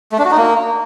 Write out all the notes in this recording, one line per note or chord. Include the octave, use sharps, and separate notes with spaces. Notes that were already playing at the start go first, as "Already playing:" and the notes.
A3
D4
F#4
D#4
A#3